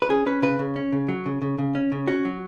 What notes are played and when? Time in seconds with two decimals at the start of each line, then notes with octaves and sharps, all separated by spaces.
0.02 B4
0.09 C#4 G#4
0.26 C#4 B4
0.42 C#3 B4
0.59 C#3
0.76 C#4
0.92 C#3
1.08 F#3
1.26 C#3
1.42 C#3
1.58 C#3
1.75 C#4
1.92 C#3
2.08 C#4 F#4
2.25 F#3